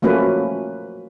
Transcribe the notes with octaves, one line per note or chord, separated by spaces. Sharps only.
F3 F#3 A3 A#3 C#4 B4